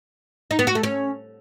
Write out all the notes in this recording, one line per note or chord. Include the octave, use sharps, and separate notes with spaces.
D#4
B3
F#4
A3
C#4